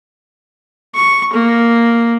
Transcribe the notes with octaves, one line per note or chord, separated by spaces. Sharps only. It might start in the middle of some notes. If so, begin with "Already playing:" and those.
C#6
A#3